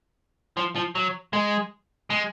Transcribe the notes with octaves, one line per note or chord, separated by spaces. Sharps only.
F3
F3
F#3
G#3
G#3